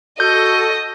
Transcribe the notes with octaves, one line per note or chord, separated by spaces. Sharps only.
F#4 A4 D#5 G6